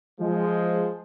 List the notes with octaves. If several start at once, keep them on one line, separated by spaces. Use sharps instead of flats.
F3 G#3